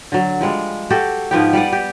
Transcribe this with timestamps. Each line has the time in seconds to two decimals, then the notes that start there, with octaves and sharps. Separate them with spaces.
0.12 D3 F#3
0.41 F3 G3 G#3
0.90 F#4 G4 A4
1.31 G#2 F3 B3 G4
1.53 G3 B4 D5 F#5
1.73 G4